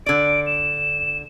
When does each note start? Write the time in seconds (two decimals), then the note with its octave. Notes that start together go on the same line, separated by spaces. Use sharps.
0.06 D3 D5 D7
0.47 E7